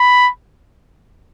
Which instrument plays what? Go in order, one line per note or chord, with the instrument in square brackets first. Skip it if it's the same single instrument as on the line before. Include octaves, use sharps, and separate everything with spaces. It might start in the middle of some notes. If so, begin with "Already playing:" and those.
Already playing: [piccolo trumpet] B5